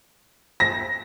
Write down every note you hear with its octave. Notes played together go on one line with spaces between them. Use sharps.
A#6